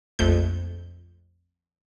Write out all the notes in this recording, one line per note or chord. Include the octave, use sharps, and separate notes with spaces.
A#1 F2 A3 G6